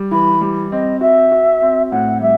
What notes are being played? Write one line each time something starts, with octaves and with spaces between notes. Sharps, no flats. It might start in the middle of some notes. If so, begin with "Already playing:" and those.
Already playing: G3
E3 B5
G3
C4 D#5
F#4 E5
F#4
C4
A2 F#5
G3 E5